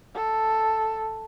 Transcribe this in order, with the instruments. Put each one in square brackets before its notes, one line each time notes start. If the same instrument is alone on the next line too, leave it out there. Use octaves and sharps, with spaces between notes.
[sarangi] A4